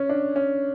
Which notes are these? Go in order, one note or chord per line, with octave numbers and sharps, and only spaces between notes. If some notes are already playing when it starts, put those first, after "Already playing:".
Already playing: C#4
D4
C#4